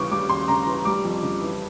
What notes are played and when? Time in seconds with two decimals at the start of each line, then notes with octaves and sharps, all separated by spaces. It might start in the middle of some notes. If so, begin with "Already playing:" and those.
Already playing: D#2 C#3 E3 G3 C#6 D6
0.11 G3 D6
0.29 D#2 C6
0.48 C#3 A#5
0.66 E3
0.85 G3 D6
1.04 F2
1.22 C#3
1.41 E3